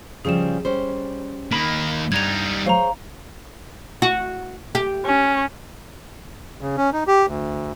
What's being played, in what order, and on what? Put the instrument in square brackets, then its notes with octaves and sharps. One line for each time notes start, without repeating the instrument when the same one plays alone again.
[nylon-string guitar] C#3 F3 G3 [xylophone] G#4 E7
[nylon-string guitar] G3 C#4 C5
[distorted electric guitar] D#3 A#3 [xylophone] B5 B6
[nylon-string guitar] G2 [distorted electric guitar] G3 D#4 [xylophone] G#6 F7
[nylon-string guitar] G#4 C5 C#5 [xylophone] F5 A#5
[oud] F#4
G4
[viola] C#4
[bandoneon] C#3
C#4
D#4
G4
D2